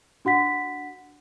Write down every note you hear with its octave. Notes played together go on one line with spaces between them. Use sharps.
D4 F#4 F#5 B6